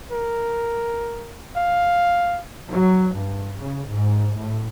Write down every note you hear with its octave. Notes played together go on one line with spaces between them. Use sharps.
A#4
F5
F#3
G2
C#3
G#2
A2